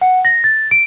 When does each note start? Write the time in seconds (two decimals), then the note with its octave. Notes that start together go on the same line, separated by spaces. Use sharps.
0.01 F#5
0.25 A#6
0.44 A6
0.71 D7